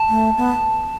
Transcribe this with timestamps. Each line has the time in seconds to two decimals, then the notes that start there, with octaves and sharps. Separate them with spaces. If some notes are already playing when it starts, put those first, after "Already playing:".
Already playing: A5
0.09 A3
0.37 B3